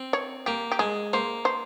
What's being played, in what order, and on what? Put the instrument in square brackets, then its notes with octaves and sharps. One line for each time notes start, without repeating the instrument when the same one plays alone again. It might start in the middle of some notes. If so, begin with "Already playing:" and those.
Already playing: [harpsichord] C4
[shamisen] C#5
[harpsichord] A#3 [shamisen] G4
[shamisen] G4
[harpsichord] G#3 [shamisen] G#4
[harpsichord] A#3 [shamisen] C5
[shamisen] C5